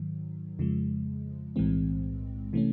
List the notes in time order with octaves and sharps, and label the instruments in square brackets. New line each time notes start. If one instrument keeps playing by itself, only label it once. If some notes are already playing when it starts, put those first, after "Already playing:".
Already playing: [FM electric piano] G#2 D#3 F#3
F2 C#3 F3 G#3
B1 A2 E3 G#3 C4
C3 E3 A3 C#4